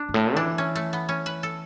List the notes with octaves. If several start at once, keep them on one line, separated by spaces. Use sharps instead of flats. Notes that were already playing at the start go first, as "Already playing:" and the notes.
Already playing: D4
G2
A2
E3 D4
C#4
A3
B3
C#4
B4
A4